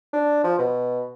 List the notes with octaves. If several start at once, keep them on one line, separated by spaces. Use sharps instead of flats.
D4
F3
B2